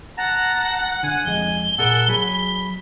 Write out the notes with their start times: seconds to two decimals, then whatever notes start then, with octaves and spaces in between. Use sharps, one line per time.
0.18 F#5 A5 A#5
1.03 D3 G#5
1.25 F2 G#3 G7
1.79 A#2 G#4 A#4 F#5 A5 E6
2.08 F#3 G#4 B5